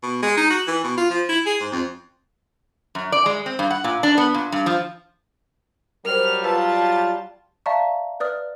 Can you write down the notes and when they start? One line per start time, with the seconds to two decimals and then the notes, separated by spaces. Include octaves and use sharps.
0.03 B2
0.23 G#3
0.37 D#4
0.50 F#4
0.67 E3
0.84 B2
0.98 F4
1.10 F3
1.29 E4
1.46 G#4
1.61 G#2
1.72 F2
2.95 F#2
3.12 D5
3.26 G#3
3.46 C4
3.59 G2
3.70 F#5
3.84 A#2
4.03 D4
4.18 B3
4.34 A#2
4.52 G2
4.66 F3
6.05 F#3 G3 A#4 C5 F6
6.44 F4 B4 A5 E6
7.66 D5 E5 F5 A5 A#5 C#6
8.20 B4 D5 D#6 F6